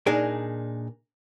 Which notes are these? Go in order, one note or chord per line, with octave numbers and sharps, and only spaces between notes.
A#2 D4 D#4 G#4 A#4